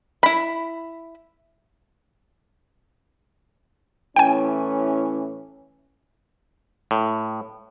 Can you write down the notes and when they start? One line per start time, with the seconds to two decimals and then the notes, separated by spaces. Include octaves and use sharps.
0.23 E4 B5
4.16 A2 E3 C#4 G5 G#5
6.91 A2